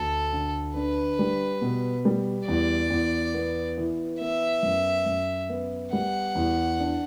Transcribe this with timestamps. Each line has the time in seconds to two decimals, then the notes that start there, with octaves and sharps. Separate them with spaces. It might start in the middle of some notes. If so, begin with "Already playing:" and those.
Already playing: D2 D3 A4
0.32 D3
0.75 D4 B4
1.19 G3
1.61 B2
2.05 G3
2.47 E2 D5
2.90 E2
3.34 B3
3.77 E3
4.21 B3 E5
4.63 F#2
5.06 F#2
5.49 B3
5.93 G3 F#5
6.35 E2
6.79 D4